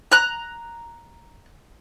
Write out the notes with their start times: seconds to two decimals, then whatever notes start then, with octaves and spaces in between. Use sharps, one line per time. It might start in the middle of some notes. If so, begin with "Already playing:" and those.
0.12 A#5 F#6